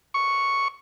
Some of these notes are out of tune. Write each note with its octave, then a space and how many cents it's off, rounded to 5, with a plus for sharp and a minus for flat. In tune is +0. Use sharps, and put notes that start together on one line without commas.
C#6 +0